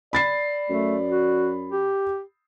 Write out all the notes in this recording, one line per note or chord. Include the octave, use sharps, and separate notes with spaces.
D5 B5 A6 C7
F#2 A3
F#4
G4